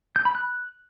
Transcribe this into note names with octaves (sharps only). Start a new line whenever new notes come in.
G6
B5
F#6